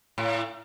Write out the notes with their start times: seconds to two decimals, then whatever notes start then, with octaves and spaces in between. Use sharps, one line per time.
0.18 A2